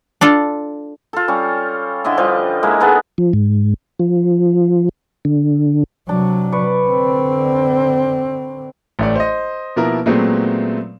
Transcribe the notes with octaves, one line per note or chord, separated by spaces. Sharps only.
D4 F4 A4
F4 A4
G3 C#4
D3 E4 D#5 E5
F3 G3 B4
G#3 A#3 E4
G#3 B3 D#4 A4
F3
G#2
F3
D3
C3 F#3 D4
B4 D5 C#6
D3 C4
A1 A3 D5
C5 D#5
B2 F3 A#3 B3 E4 A#4
A#2 F#3 G#3 A3 B3 C4